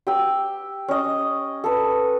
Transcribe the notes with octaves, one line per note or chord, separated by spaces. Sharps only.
G4 E6
C#4 D#5
A4 B4